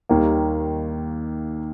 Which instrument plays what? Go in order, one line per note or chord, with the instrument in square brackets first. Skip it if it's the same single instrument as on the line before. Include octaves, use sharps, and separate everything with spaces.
[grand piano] D#2 D#3 G3 A#3